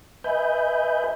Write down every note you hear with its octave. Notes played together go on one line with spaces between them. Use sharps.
B4 D#5 E5 G#5 B5 G6